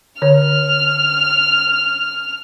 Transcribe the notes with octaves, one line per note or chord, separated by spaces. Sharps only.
D3 C#5 F6